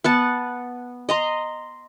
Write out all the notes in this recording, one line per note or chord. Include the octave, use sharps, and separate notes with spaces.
B3 F#5 A5
D#5 A#5 C6